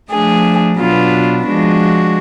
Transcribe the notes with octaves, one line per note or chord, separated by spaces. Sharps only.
F3 A3 D4 G#4
B2 F#3 B3 D4 F4
F3 G#3 D4 F#4